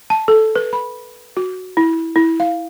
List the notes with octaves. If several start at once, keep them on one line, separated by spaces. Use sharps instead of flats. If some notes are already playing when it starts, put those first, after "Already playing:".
A5
A4
B4
B5
F#4
E4
E4
F5